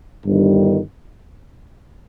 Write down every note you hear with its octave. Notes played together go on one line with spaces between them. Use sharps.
G1 G2 D#3 G3